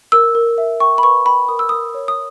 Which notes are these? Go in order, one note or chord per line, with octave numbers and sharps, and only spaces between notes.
A#4 E6
A#4
E5
G5 C#6
B5
B4 C#6
G5 B5
A#4 D#6
E6
A#4 D#6
C#5
D#6